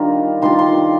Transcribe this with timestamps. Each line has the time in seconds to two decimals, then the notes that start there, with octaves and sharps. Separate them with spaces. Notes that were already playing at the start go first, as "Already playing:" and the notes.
Already playing: D#3 G3 D4 F4 A#5
0.42 D#3 G3 D4 F4 C6
0.59 C6